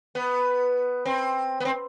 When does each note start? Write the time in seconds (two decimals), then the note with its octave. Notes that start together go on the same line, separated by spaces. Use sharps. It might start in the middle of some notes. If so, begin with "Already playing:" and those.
0.15 B3
1.05 C4
1.60 B3
1.65 C4